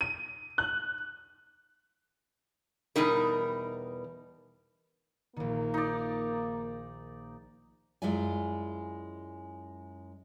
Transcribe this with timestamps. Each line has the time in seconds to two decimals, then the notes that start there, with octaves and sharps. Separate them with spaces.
0.01 D#7
0.58 F#6
2.96 E2 B2 G3 D#4 A#4
5.36 A#1 D#3 A#3
5.74 D#4 D5
8.02 F#2 G#3 E4 F4 D5 G#5